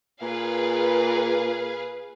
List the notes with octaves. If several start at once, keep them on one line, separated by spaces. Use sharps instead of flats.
A#2 G#4 B4 F5